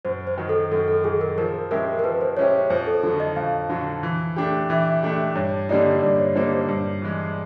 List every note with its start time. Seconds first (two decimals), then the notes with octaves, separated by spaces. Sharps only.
0.05 F#2 C5
0.27 C5
0.38 D#3 F#3
0.49 A4
0.71 F#2 A4
0.88 A4
1.04 D#3 F#3 G#4
1.21 A#4
1.38 F3 A#4
1.71 G#3 C#4 E4 G4 A#4
1.99 A#4
2.04 F3 B4
2.21 C5
2.37 G#3 C#4 E4 G4 C#5
2.70 F2 C5
2.87 A4
3.03 D3 A4
3.06 F#3
3.20 D#5
3.36 F2 F5
3.70 D3 F#3
4.03 E3
4.36 A3 D4 G4
4.69 E3 E5
4.86 E5
5.02 A3 D4 G4 D#5
5.19 D#5
5.36 G2 C#5
5.69 D3 G3 A#3 D#4 D5
6.02 G2 D5
6.19 C#5
6.35 D3 G3 A#3 D#4 C5
6.52 C5
6.68 G2
7.02 E3 G#3